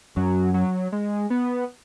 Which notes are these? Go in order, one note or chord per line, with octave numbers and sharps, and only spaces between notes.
F#2 F#3
F#3
G#3
B3